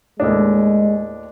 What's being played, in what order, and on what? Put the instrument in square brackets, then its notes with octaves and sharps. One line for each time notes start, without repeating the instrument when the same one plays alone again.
[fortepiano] D#2 A2 D4 [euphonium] G#3